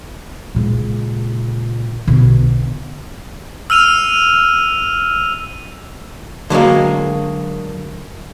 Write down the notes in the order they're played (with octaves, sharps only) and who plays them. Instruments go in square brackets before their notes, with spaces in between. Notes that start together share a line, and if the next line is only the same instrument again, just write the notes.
[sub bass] A#2 [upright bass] C#3 G#3
[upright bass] B1 B2 [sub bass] D3
[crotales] E6 F6 D#7 F7
[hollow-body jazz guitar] D3 F#3 G#3 A#3